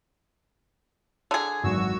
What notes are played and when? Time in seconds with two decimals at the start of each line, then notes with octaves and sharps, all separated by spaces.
1.31 D3 G#4
1.64 G#1 F#2 E3 F#4 E6